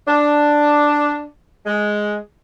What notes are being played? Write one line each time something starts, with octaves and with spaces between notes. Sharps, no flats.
D4
G#3